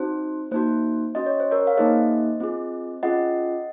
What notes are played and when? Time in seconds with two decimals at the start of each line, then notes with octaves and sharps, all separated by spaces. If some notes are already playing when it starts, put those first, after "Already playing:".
Already playing: C4 D#4 F#4 C5
0.51 A#3 D#4 F#4 C5
1.15 C#4 F#4 D#5
1.26 C#5
1.40 C5
1.51 A#4 C#5
1.67 F5
1.77 A#3 D#4 G#4 C5 D#5
2.40 C4 F4 G#4
3.03 C#4 F4 G#4 D#5 F#5